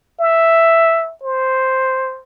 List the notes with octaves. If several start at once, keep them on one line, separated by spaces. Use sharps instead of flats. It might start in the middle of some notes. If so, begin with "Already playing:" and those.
E5
C5